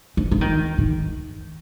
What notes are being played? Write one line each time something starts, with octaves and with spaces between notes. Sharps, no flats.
F3
F3
D#3
D#3